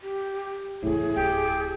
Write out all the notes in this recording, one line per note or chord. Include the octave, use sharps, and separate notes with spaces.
G4
E2 A2 C#3 G#4
D1 G4 G5